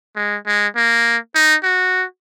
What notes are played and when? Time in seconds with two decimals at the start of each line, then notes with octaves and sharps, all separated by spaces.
0.16 G#3
0.47 G#3
0.76 A#3
1.35 D#4
1.63 F#4